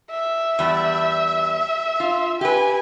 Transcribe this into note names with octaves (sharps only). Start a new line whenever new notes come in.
E5
E2 G3
F4
G4 B4 G#5